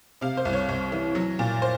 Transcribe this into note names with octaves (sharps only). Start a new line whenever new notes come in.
C3 F5
C5
C2
C#5
C2
E3
F#3
A#2
C5